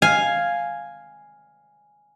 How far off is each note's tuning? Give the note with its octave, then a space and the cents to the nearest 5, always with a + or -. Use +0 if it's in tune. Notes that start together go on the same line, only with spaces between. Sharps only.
F5 +0 G#5 +0